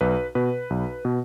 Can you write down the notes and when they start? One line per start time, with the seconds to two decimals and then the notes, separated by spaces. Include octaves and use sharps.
0.01 B1 B4
0.35 B2 B4
0.70 B1
1.05 B2